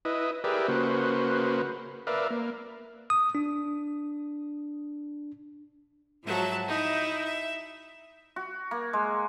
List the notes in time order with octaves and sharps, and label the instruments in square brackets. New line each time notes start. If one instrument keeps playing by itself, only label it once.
[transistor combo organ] E4 B4 D#5
G4 G#4 A#4 B4 D5 E5
C#3 A#3 F#4 B4 C5
A#4 B4 D5 E5 F5
A#3
[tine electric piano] D#6
D4
[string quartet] G#2 F3 F#3 E5 A5
D#4 E4 E5
E5
[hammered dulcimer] F#4
A#3
G#3